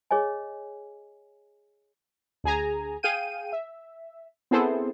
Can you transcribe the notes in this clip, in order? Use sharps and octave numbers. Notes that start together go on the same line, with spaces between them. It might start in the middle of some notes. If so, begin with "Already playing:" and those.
G#4 C#5 D#5 G#5
D2 G#4 G#5 A#5
G#4 F5 G5 D#7
E5
B3 C4 E4 G#4 A4 C5